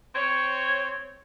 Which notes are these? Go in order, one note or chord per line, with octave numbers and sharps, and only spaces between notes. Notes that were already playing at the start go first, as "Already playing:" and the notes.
C4 C#5